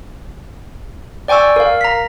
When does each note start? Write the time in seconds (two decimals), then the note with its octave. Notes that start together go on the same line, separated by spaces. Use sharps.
1.28 D5 G5 G#5 C#6 E6
1.56 A#4 F5
1.81 A#5 B6